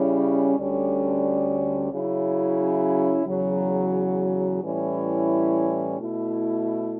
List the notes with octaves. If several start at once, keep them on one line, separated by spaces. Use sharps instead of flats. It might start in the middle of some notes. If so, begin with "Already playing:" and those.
Already playing: C#3 G3 C#4 E4
D2 D3 G3 C#4
C#3 F#3 C#4 E4
E2 C#3 F#3
A2 E3 G3 C#4 E4
B2 A3 E4